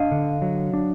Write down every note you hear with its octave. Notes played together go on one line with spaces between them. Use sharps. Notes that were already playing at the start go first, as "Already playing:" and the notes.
Already playing: D4 D#5 F5
D3
F#3
D4